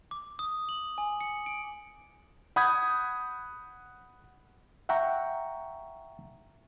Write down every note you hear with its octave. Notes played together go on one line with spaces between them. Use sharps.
D6
D#6
F#7
G#5
C#7
D7
F#5 B5 D#6 G6 G#6
E5 F#5 G5 A#5 C#6